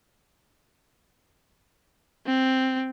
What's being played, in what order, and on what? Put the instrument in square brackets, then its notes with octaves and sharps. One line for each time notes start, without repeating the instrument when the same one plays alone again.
[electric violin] C4